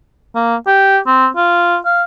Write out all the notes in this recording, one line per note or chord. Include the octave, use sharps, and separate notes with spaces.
A#3
G4
C4
F4
F5